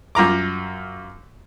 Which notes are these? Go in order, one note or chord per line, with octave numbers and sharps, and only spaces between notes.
F#2 F4 A#5 D6